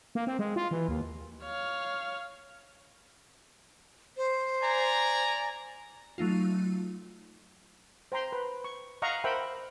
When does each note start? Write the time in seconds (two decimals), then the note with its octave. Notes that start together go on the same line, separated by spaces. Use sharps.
0.15 A#3
0.27 C4
0.39 G#3
0.56 F4
0.71 E3
0.89 D#2
1.44 C#5 F5
4.17 C5
4.63 D5 G#5 A#5
6.18 F#3 A3 D#4 F4
8.12 C5 G5 A#5 C6
8.32 B4
8.64 C#6
9.02 D#5 F5 F#5 A#5 C#6
9.24 A#4 C5 E5 F#5 G5 B5